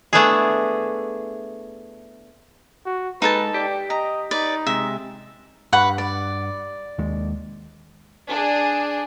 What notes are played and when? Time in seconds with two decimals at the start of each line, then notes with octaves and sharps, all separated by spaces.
0.13 A3 B3 D4 E4 G#4
2.86 F#4
3.22 G#3 D#4 A4 B4 A5
3.54 G4 D5 G5
3.90 D#5 A#5
4.31 D#4 B4 D5
4.67 C3 G#3 E5
5.72 G2 B4 F#5 C#6
5.98 D5
6.98 D#2 G#3
8.29 D4 G#4